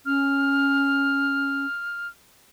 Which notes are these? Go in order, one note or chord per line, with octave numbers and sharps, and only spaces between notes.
C#4 F6